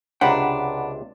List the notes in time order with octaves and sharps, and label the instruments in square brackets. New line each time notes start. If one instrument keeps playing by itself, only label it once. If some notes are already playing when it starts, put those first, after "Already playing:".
[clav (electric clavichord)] C#2 C3 C5 [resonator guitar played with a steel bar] D4 [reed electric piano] F#5 B5 [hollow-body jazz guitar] G5 A#5